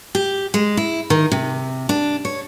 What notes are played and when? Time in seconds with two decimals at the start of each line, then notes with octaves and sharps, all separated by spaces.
0.15 G4
0.54 G#3
0.77 E4
1.10 D#3
1.32 C3
1.89 D4
2.25 C#5